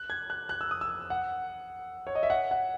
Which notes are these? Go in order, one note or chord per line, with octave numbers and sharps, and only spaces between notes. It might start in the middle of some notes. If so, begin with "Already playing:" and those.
Already playing: F#6
G#6
F#6
F#6
E6
D#6
E6
F#5
C#5
D#5
E5
F#5
F#5